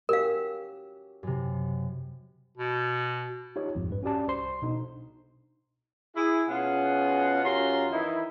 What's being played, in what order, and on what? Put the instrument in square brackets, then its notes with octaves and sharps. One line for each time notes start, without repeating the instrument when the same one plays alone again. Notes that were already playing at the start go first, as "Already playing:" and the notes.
[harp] C#4 F#4 G4 [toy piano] A#4 F5
[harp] F#2 C3
[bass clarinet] B2
[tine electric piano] D#4 F4 G4 C#5
A#1 F2 G#2
G2 B4
C#4 F#4 G4 D5 A5
C2 C5 C6
B2 D4 D#4
[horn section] E4 G#4
B2 C#4 F4 G#4 F#5
F#2 C#4 F4 G4 A#5 C6
D#3 E3 D#4 E4